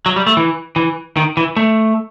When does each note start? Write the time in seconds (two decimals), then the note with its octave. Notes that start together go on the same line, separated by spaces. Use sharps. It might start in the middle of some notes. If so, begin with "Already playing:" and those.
0.06 F#3
0.16 G3
0.27 A3
0.37 E3
0.76 E3
1.17 D#3
1.37 E3
1.57 A3